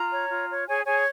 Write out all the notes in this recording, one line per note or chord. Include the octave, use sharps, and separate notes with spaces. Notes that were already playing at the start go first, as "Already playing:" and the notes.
Already playing: F4 A#5
C#5
F4
C#5
G#4 C#5 G#5
G#4 C#5 G#5